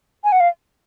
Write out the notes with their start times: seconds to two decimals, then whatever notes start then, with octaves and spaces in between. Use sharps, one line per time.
0.24 G#5
0.32 F#5
0.40 F5